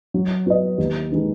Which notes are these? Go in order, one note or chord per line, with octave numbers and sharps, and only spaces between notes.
F#3
B3 F#4 B4 D#5
D#2
D#3 G#3 D#4 B4